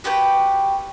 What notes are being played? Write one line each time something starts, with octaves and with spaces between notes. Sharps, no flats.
F#4 G4 B4 G6